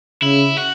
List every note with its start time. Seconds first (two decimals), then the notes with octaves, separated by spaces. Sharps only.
0.22 C#3 E4
0.57 F#4